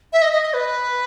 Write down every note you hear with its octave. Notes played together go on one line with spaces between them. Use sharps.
E5
D#5
D#5
D#5
B4